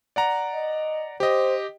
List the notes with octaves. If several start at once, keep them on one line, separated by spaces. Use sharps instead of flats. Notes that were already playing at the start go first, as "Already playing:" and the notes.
D5 F#5 A#5
D#5
G4 C5 D#5